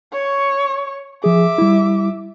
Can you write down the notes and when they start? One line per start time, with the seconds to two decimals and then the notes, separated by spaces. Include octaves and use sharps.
0.13 C#5 C#6
1.24 F3 G#4 E5 D6
1.58 G3 E4